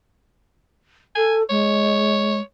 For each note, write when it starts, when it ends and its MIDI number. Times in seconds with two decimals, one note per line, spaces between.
1.15 1.42 69
1.15 1.36 80
1.50 2.40 56
1.50 2.40 73